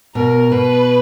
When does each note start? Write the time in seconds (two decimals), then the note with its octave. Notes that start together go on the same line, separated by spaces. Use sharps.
0.15 B2 A#4
0.51 B2 B4